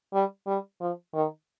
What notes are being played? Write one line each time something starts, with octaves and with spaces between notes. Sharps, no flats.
G3
G3
F3
D#3